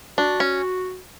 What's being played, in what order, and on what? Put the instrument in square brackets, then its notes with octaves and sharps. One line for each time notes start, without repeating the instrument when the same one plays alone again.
[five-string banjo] D4 [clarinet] F#4
[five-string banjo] C#4